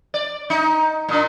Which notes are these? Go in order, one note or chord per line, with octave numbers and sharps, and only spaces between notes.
D5
D#4
A#2 D4